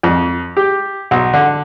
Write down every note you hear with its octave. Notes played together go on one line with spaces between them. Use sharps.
F2
G4
B1
D3